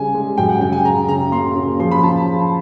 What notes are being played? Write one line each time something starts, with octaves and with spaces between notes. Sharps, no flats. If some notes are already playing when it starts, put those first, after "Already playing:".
Already playing: C#3 G3 G#5
G#3
F#2 G5
F#5
C#3 G5
G#5
C#3 A#5
C#3 A#5
A#3 C6
C#3
F3 C6
B5
C#3 A5